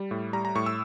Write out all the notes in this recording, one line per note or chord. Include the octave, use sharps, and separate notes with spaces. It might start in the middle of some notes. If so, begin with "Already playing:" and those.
Already playing: G3
A2
G3 A#5
A#5
A2 C#6
E6